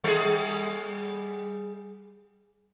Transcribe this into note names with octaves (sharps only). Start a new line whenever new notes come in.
G3 G#4